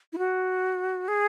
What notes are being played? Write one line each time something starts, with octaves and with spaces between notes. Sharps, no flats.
E4
F#4
G#4